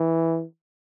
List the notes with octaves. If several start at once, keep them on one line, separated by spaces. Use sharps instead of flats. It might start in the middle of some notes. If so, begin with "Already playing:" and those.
Already playing: E3